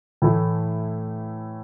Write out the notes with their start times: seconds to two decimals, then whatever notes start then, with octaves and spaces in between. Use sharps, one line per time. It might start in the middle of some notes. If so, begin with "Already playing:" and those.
0.22 A2 E3 A3 E4